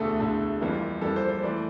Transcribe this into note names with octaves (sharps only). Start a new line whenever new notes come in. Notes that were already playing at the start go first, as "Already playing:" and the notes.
Already playing: E1 D2 D3 A3 A4
E1 D2 D3 A3
F2 E3 G3 A#3
F2 E3 G3 A#3 A4
C5
C5
E3 A3 D5